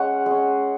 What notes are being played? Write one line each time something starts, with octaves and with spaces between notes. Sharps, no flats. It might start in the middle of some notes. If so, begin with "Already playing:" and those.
Already playing: G#3 C#4 F#5
G#3 C#4